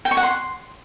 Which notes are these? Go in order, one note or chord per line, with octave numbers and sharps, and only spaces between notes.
G5
C#6
F#5
C6